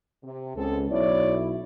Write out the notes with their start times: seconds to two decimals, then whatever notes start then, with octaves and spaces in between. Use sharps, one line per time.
0.23 C3
0.55 C#2 C4 G#4 A4
0.90 B1 E4 C#5 D5